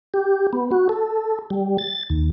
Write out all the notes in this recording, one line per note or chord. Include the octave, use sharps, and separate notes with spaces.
G4
B3
F#4
A4
G3
A6
D#2